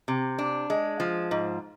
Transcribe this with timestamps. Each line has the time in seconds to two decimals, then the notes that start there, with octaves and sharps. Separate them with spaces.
0.08 C3
0.39 D4
0.70 G#3
1.00 F3
1.31 G#2